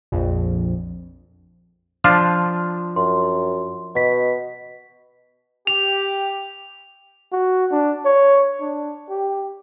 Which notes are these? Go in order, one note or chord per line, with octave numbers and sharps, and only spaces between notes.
A#1 F2
F3 D4 F4 C6
F#2 C6
B2 D#5 B6
G4 F7
F#4
D4
C#5
D4
G4